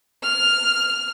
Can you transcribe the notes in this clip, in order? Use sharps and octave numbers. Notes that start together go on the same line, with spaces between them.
F6